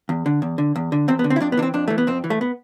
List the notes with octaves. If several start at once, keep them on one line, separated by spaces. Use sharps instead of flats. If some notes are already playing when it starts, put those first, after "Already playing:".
E2
D3
E2
D3
E2
D3
E2 C4
B3
D3
C4
E4
F2 D4
B3
E3 D4
C4
F2 D4
E3 A3
B3
F2 C4
E3
A3
B3